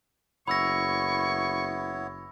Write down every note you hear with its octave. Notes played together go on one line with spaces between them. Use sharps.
F#1 B3 E4 C#5 B5 C#6 E6 A#6